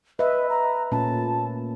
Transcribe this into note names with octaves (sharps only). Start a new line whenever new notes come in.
B4 D#5 E5
A#5
A#2 A3 C#4 A5